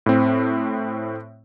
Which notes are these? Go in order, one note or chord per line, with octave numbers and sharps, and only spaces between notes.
A2 C4